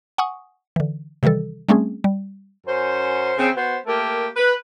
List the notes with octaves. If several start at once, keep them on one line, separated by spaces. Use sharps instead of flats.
F#5 G#5 C#6 D#6
D3 E3
C3 D#3 E3 G3 A4
G3 A3 C4 C#4 G#4
G3
F#2 C#4 C5
C#3 C4
B3 F#4 C5
A3 A#3 G4 A#4
B4